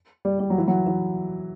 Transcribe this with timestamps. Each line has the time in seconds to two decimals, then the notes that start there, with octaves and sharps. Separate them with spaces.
0.25 G3
0.40 G3
0.50 F#3
0.58 E3
0.68 F#3
0.87 E3